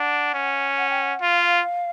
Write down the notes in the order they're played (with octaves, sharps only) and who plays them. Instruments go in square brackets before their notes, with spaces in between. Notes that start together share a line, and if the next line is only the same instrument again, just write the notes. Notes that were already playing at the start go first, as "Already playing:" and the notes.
Already playing: [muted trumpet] D4 [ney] F#5
[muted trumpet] C#4
[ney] F#5
G5
F#5
[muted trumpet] F4 [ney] F5